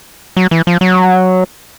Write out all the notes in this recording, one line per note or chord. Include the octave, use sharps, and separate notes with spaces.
F#3
E3
F3
F#3